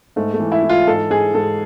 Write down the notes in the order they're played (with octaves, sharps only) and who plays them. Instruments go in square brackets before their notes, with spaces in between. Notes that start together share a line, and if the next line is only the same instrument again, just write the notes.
[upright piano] G#2 A3
A3
E3
E4
E3
F4
G#2 A4
G#2 G#4
G#2 A4